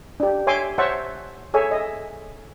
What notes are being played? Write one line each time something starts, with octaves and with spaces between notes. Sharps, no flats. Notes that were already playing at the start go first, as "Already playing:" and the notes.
D4 G4
C#5 E5 G#5 C6 D6
C5 C#5 E5 F#5 A5 C#6
G#4 A4 C#5 E5 G#5
D#5 E5